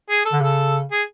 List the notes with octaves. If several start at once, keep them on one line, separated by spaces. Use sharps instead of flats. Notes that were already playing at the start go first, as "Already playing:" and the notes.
G#4
A4
D3
C#3 A4
G#4